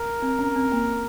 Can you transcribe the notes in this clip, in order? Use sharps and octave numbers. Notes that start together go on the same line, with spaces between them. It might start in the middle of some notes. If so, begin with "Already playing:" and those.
Already playing: A#4
C4
C#4
C4
A#3